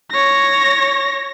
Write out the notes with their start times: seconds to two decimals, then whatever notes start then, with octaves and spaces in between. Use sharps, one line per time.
0.12 C#5 A#6